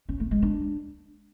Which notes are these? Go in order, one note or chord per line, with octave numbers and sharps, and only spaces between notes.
C#4
A3
G#3
D4